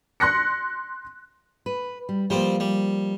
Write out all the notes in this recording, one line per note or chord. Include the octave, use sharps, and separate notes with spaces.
C6 F#6 A#6 C#7
B4
G3
F3 G3 A#3 C4
G3